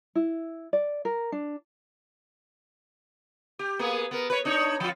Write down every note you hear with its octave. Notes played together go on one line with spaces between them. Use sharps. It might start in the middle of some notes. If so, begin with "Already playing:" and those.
E4
D5
A#4
D4
G4
A#3 B3 G#4
B3 A#4
B4 C#5
D4 D#4 C#5
F3 F4